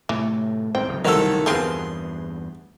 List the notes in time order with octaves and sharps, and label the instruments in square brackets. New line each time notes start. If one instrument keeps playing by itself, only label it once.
[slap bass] A2 C3 A3 [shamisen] E3
[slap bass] A1 G#2 [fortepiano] C4 [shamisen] G5
[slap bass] D1 C#3 F#3
[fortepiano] C2 F#4 E6 [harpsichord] D#3 A4
[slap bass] E2 G2 [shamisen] F3 C4 A#4 [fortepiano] B3 G#4 [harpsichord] C6